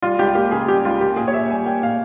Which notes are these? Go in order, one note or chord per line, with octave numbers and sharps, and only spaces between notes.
G3 F4
C#2 G4
A#3 G4
C#3 G#4
G3 G4
C#2 F4
A#3 G4
A#2 G#4
C#5
A#2 E5
G3 G#5
A#3 G5
A#2 F5